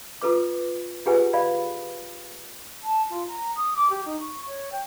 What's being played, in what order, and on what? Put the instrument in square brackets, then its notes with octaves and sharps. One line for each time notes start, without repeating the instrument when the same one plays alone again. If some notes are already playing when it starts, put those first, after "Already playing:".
[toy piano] F4 A4 B4 D6
F4 G4 G#4 B4 F#5 G#5
D5 F5 B5
[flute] A5
F4
A#5
D#6
D6
G4
D#4
C#6
C#5
G5